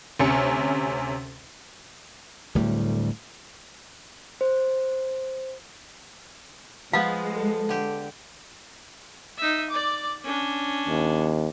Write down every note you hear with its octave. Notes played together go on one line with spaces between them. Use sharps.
D2 C3 C#4 C#7
D1 D2 A2 G3
C5
F3 G#3 B3 F5
A4
D3 G4
D#4 E5
D5 D6
C#4 D4
D#2